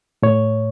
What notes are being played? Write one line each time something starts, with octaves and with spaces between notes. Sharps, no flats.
A2 C#5